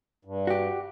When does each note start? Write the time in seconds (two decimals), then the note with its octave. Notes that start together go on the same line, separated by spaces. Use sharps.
0.25 G2
0.47 F#4 G4